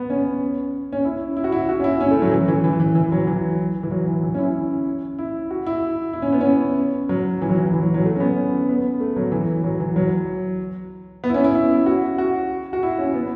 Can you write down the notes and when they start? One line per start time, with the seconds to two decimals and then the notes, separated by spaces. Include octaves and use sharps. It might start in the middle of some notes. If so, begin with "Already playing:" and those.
Already playing: B3
0.10 C#4
0.93 C#4
1.05 E4
1.37 E4
1.44 F#4
1.52 E4
1.69 F#4
1.80 C#4
1.84 E4
2.00 C#4
2.11 A3
2.22 F#3
2.32 E3
2.48 E3
2.64 E3
2.80 E3
2.95 E3
3.12 F#3
3.27 E3
3.83 E3
3.91 F#3
4.07 E3
4.23 E3
4.34 C#4
4.38 E4
5.19 E4
5.51 F#4
5.67 E4
6.13 E4
6.22 C#4
6.32 B3
6.41 C#4
7.09 F#3
7.42 E3
7.49 F#3
7.58 E3
7.73 E3
7.83 F#3
7.94 F#3
8.05 A3
8.16 C#4
8.20 B3
8.36 C#4
8.69 B3
9.00 A3
9.16 F#3
9.32 E3
9.64 F#3
9.80 E3
9.96 F#3
11.24 B3
11.29 E4
11.34 C#4
11.44 E4
11.55 E4
11.86 F#4
12.18 F#4
12.73 F#4
12.83 E4
12.99 C#4
13.14 B3